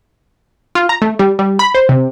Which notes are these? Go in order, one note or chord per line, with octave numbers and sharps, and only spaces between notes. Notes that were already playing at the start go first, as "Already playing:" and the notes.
F4
A#5
A3
G3
G3
B5
C5
C3